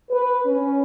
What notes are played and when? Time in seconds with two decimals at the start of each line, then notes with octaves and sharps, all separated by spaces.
0.11 B4
0.45 C#4